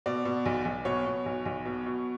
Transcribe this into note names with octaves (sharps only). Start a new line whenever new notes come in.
B2 D5
B2
B1
B1
B2 C#5
B2
B1
B1
B2
B2